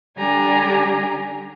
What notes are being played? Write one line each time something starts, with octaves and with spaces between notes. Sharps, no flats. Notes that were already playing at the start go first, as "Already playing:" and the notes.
D3 G3 D4 G4 G#5 A#5